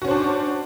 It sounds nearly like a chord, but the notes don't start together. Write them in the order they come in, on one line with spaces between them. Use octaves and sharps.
F#4 C#4 C5 D4